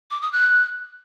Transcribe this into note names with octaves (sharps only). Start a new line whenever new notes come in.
D6
D#6
F#6